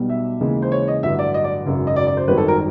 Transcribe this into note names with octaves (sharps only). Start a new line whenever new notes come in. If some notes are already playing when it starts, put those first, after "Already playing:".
Already playing: B1 B2 G3
E5
D#2 C#3 E3 G#3
C5
C#5
D#5
A1 G2 D3 F#3 E5
D5
D#5
D5
G#1 F#2 C#3
D#5
D5
D5
C5
G#1 F#2 D#3 G3 C4 B4
A4
A#4